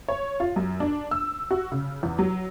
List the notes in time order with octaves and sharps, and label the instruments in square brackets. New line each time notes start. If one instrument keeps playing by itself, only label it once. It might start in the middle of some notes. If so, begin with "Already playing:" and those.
[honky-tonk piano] C#5
F4
F#2
D4
E6
F#4
C#3
E2
F#3